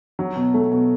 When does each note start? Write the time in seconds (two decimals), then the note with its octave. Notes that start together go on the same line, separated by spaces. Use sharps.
0.19 F#3
0.36 B2
0.54 A3
0.71 B2